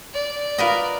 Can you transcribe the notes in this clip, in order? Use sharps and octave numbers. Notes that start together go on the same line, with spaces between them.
D5
F4 A#4 B4 D#5 F5 F#5